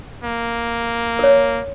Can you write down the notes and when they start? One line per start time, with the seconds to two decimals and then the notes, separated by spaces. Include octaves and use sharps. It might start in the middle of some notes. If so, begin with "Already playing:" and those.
0.24 A#3
1.19 A#4 C#5